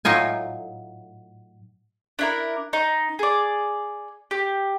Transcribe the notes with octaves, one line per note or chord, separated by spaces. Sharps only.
A2 F#3 D#4 F4 G#5
D4 E4 A#4
D#4
G#4 D5
G4